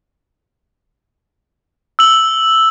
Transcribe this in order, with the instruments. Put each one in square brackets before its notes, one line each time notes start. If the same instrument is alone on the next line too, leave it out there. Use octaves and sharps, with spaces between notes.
[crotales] E6 F#7